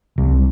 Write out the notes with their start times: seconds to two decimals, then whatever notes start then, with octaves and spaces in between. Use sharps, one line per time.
0.18 C2